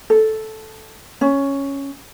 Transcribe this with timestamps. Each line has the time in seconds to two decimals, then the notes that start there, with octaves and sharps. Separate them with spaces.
0.10 A4
1.21 C#4